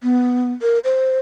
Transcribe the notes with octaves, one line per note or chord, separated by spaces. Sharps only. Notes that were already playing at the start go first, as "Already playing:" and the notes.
B3
A#4
C5